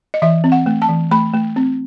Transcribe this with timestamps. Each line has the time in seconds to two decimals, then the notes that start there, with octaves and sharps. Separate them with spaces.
0.14 D#5
0.22 E3 E5
0.44 C4
0.52 F#5
0.66 A3
0.82 A5
0.89 E3
1.11 A3 B5
1.34 A3
1.56 C4